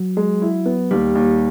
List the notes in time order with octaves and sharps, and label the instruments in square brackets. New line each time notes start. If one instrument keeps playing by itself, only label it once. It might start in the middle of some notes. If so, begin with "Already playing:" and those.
Already playing: [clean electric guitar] F#3
[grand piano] G#3
E4
B3
[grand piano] D#2 [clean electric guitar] G3
[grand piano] D#2